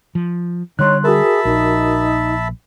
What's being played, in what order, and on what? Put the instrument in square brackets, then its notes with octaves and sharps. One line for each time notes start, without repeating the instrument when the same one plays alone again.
[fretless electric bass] F3
[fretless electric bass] D3 G3 [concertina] D#4 [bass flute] C#5 [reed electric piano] C6 F#6
[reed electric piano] F#4 A#4 [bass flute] G#4 [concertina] E5 A5 B5
[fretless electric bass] A#1 [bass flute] D#4